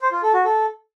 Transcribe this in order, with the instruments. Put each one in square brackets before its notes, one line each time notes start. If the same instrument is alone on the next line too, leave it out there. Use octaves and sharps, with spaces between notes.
[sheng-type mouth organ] C5
F4
A4
F#4
A4